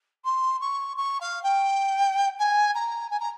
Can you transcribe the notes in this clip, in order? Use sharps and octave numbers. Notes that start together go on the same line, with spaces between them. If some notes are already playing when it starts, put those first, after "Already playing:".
C6
C#6
C#6
F5
G5
G#5
A#5
G#5
A#5